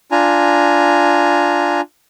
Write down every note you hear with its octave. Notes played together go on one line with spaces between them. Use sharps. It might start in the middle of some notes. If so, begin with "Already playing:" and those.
D4 F4 G#5 A#5